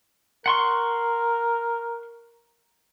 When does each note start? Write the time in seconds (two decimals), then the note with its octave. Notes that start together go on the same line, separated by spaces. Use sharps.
0.46 A#4 F#5 C6 C#6